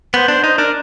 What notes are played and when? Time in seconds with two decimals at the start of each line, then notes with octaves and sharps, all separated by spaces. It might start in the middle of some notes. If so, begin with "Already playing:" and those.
0.14 B3 C5
0.28 D4 C5
0.44 D#4 C5
0.58 D4 A#4